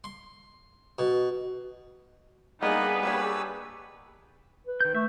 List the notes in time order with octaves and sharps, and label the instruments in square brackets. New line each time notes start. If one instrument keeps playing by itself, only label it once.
[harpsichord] C6
B2
[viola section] G3 G#4 B4 [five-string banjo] A#3 D4 [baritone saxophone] B3 [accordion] D#4 D#5
[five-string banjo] A#3 D4 [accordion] G4 C#5 E6
[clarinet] B4
[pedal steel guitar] D#3 G6
[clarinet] A3 [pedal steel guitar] E5